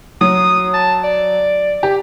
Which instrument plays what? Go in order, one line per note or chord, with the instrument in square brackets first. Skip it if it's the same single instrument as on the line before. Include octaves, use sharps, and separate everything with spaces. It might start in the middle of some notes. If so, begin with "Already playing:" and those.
[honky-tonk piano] F#3 [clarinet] D#6
[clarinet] A5
D5
[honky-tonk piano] G4